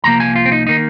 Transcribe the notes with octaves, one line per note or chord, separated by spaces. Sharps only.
C2 A#2 F3 A#3 A#5
G#5
F4
C4
D#4
D#3 A#3 D#4